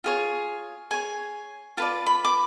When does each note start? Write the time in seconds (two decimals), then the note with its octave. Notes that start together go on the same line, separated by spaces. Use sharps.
0.04 F4 G#4 C#5
0.91 G#4 C#5 G#5
1.77 F4 B4 D5 A5
2.06 B5
2.25 D6